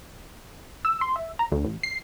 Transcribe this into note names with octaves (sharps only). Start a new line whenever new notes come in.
E6
C6
E5
A#5
D2
A1
C7